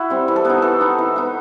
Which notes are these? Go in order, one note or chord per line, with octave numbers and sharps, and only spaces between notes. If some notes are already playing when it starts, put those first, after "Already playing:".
Already playing: E4 F#4
G3 C4
E3
A4
B3 D#4 B4
E3 A4
B3 D#4
E3
B3 D#4